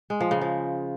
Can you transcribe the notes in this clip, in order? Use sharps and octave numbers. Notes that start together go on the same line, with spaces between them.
G#3
F3
C#3
F3